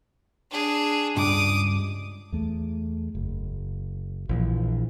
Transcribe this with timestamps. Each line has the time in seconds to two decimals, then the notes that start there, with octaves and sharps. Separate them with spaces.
0.51 D4 G#4
1.17 C#2 G2 D6 D#6
2.32 E2 A3
3.15 F#1
4.29 A#1 E3 F3